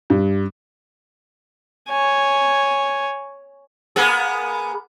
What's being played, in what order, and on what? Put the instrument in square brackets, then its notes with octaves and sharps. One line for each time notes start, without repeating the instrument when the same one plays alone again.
[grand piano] G2
[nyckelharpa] C#5 G#5
[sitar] A#3 B3 G#4